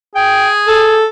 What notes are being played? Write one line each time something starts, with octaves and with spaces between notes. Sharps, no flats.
G#4 G5
A4